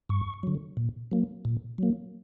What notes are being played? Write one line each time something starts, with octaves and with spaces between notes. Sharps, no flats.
G2 C#6
D3 F#3
A#2
F#3 A#3
A#2
F#3 A#3